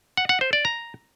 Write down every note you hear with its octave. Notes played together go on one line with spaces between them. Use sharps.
F#5
F#5
C5
D5
A#5